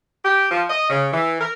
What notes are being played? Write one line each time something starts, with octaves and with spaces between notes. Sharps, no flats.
G4
F3
D#5
C#3
E3
A#4